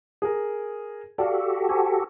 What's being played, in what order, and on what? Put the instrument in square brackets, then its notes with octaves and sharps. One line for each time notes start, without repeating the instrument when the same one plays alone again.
[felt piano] G#4 A#4
[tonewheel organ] F#4 G4 A4 [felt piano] D5 F5
[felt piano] C5 G#5